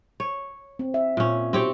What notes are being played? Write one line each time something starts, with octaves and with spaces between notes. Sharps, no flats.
C#5
C4
E5
A#2 C#4
B2 C4 D#4 F#4 G4 C#5